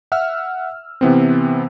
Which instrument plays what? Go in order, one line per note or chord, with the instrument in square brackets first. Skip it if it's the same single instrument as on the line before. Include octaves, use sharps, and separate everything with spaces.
[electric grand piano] E5 F#5 E6 F6
C3 E3 B3 C4